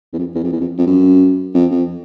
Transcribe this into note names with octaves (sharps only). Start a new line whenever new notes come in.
E2
F2
E2
F2
E2
F2
F2
F#2
F2
F2